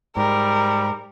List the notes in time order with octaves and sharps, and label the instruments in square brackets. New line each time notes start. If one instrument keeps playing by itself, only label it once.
[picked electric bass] G#2 [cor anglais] G3 [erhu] A#4